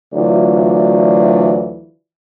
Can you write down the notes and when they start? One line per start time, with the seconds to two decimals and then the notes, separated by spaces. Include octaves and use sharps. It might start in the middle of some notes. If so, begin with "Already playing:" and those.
0.14 D2 E3 F#3 F4 D5